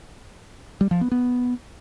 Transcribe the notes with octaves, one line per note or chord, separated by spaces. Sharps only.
G3
F3
B3
B3